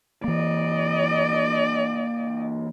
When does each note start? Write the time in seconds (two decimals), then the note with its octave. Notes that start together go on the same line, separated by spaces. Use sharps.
0.24 E3 A#3 D5 D#5